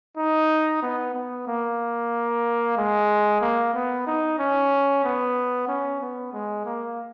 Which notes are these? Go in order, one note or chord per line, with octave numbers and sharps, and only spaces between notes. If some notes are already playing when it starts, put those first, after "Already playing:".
D#4
B3
B3
A#3
G#3
A#3
B3
D#4
C#4
B3
C#4
B3
G#3
A#3